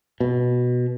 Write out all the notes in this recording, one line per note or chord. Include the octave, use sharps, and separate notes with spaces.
B2